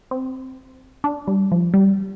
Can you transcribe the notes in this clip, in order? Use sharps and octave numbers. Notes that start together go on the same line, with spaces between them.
C4
D4
G3
F3
G3